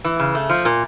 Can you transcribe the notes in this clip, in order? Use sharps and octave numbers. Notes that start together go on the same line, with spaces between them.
E3
C#3
A3
F3
A#2